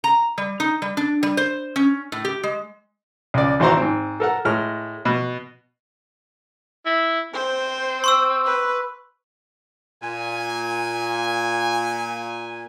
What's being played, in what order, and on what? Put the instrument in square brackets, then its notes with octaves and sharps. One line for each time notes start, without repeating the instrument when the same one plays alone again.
[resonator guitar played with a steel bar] A#5
G3
D#4
G3
D4
G3
C5
C#4
A2
G4
G#3
[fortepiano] C#2 D5
G#1 E3 F#4 C5 A#5 C6
G#2 C4
A4 A#4 F#5
A2 G#3 F6
B2
[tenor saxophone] E4
[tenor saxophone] C4 [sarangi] C5
[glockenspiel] C6 C#6 E6
[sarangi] B4
[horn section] A#2 G#5